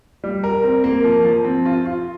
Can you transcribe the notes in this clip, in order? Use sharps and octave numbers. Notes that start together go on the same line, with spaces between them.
G3
A#4
C4
A#3
F3
F3
C4
F4
F4